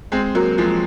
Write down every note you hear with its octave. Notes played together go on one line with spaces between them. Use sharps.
G#3 C4
F#3 A#3
F3 G#3